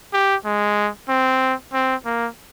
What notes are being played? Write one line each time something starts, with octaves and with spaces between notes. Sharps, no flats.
G4
G#3
C4
C4
A#3